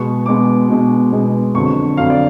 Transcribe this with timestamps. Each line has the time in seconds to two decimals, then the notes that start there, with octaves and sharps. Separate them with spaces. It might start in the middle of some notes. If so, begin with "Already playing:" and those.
Already playing: B2 G#3 B3 C#6
0.26 B2 G#3 B3 D6
0.69 B2 G#3 B3
1.12 B2 G#3 B3
1.54 F2 D3 F#3 C#6
1.97 F2 D3 F#3 F5
2.10 D5